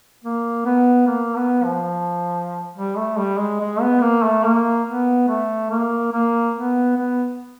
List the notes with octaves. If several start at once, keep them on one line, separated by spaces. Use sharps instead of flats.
A#3
B3
A#3
B3
F3
G3
A3
G3
G#3
G#3
B3
A#3
A3
A#3
B3
A3
A#3
A#3
B3
B3